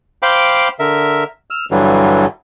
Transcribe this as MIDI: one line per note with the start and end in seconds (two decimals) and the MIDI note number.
0.22 0.68 72
0.22 0.68 77
0.22 0.68 79
0.22 0.68 83
0.22 0.68 86
0.79 1.24 50
0.79 1.24 70
0.79 1.24 76
1.50 1.65 88
1.50 1.65 89
1.71 2.26 43
1.71 2.26 50
1.71 2.26 52
1.71 2.26 54
1.71 2.26 55